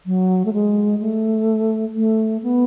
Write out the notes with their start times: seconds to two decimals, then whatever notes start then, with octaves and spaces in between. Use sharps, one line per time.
0.06 F#3
0.45 A3
0.53 G#3
1.00 A3
1.95 A3
2.43 B3